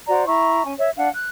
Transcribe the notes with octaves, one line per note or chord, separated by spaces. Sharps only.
F#4 C5 D5 A#5
E4 A#5 C#6
C#4 G#5
C#5 E5
D4 F5 F#5
F#6